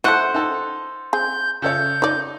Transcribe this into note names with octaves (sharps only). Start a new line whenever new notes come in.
A3 E4 F#4 C5 F#5 C#6
D#4 A4
C4 G#4 G6
C#3 A4 C#5 G6
D#4 C#5 D5